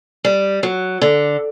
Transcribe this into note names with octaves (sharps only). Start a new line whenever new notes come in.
G3
F#3
D3